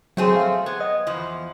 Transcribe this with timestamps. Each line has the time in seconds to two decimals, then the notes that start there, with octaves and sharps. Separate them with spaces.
0.17 F#3 A3 C4 G#4
0.36 F5
0.66 B3 G#6
0.81 D#5
1.07 E2 F3